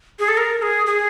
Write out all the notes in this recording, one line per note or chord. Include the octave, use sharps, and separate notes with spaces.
G#4
A4
A#4
G#4
G#4